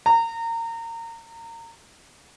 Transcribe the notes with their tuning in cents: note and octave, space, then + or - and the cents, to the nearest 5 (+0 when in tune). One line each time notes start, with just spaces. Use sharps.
A#5 -25